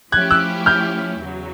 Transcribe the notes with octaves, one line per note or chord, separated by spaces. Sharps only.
F3 A3 C#4 E4 G4 F#6 G#6
E6 F#6
F6 G6
E2 C#3 F#3